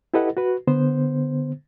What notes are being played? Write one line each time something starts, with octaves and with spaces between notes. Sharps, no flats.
E4 G4 A4 B4 D#5 F#5
F#4 B4
D3 B3 C5